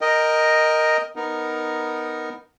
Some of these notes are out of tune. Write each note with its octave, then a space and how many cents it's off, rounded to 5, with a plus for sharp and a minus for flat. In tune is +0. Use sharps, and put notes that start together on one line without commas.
A#4 +0 D#5 +0 G5 +0
B3 +0 D#4 +0 A#4 +5